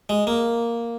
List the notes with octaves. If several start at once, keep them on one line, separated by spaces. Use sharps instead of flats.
G#3
A#3